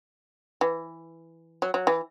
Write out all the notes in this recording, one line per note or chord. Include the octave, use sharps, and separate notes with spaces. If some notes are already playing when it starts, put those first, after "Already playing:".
E3
F#3
F#3
E3